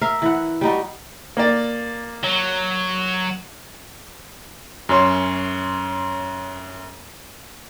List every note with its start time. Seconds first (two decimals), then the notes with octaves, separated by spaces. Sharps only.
0.01 A#4 E5 F5
0.22 E3 F#5
0.61 G3 D#4 F#4
1.37 A#3 D5
2.23 F#3
4.89 F#2 C#4 C#5 C6